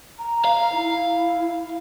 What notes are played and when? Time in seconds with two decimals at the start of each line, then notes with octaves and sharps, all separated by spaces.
0.18 A#5
0.45 F5
0.72 E4